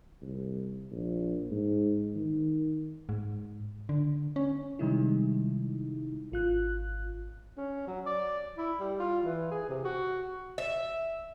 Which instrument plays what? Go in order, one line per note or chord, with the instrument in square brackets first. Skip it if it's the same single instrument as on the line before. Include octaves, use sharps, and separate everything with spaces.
[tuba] C2
A#1
G#2
D#3
[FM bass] G#2
D3
C#4
[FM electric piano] C3 D#3 G3 G#3 D#4 E4
G#1 F4 F#6
[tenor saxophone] C#4
F#3
D5
E4
G3
F4
E3
G#4
C3
F#4
[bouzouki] E5